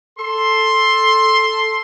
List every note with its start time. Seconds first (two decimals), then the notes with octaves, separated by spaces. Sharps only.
0.18 A4 C6